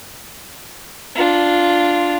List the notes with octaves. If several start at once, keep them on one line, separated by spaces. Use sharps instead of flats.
D4 F4